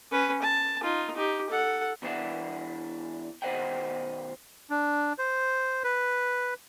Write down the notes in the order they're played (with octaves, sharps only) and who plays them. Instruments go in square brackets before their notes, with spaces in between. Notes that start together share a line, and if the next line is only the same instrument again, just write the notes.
[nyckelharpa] C#4 B4
A5
D#4 F4
D#4 G4
A4 F#5
[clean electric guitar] E2 E3 B3 D4 E5 F#5
B2 D#3 C5 D#5 F#5 G5
[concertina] D4
C5
B4